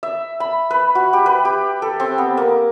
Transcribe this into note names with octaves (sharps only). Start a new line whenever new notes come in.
E5
B5
B4
F#4
G4
B4
G4
A4
C4
B3
A#3